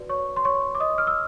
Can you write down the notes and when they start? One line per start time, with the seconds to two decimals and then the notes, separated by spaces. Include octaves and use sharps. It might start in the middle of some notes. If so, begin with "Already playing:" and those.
Already playing: F#4 B4 D5
0.09 C#5 C#6
0.36 C6
0.45 C#5 C#6
0.75 D6
0.80 D#5 D#6
0.98 F6
1.07 E6